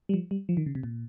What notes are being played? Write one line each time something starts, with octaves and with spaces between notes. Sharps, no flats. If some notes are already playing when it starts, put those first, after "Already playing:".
G3
F3
G3
F3
D#3
C#3
C3
A#2